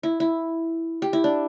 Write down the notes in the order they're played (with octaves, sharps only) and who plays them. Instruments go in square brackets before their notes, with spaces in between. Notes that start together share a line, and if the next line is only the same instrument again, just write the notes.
[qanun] E4
E4
G4
E4
D4